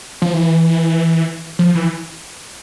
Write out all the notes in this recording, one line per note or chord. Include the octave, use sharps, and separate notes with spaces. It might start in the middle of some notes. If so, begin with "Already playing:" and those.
F3
E3
F3
E3